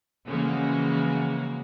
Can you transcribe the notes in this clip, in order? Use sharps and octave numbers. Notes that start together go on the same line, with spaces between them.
C#3 E3 F3 G#3 A#3 F#4